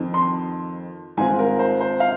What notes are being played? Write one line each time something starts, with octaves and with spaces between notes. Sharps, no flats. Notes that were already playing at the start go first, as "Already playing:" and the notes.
Already playing: F2 D#3 C4
C6
G#2 D#3 C4 F4 G#5
A#4
C5
C5
F5